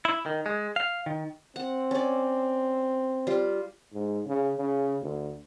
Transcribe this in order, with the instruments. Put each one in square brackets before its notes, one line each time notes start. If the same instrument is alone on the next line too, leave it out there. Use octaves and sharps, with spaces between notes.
[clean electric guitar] E4
D#3
G#3
F5
D#3
[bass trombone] C4 [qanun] F#5
[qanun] C#4 D5
G3 F4
[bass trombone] G#2
C#3
C#3
D2